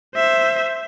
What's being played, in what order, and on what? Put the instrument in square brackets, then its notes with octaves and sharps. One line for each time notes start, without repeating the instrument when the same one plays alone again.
[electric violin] C5 E5